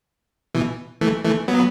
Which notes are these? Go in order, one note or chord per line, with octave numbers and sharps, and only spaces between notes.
B2 E3
E3 A3
E3 A3
F#3 B3